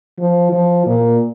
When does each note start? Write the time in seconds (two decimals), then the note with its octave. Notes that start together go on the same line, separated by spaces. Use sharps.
0.19 F3
0.53 F3
0.86 A#2